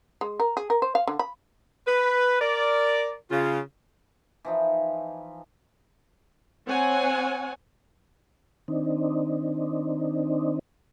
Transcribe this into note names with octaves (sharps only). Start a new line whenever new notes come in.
G#3
A#4
G#4
A#4
C5
F5
D3
B5
B4
A#4 D5
C#3 F4
E3 F3 D#4
C4 C#5 F#5 G#5
D#3 C4 D4 D#4